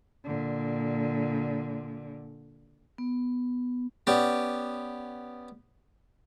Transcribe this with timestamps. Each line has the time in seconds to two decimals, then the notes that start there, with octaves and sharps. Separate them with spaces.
0.24 A#2 D3
2.98 B3
4.07 B3 C#4 G4 D5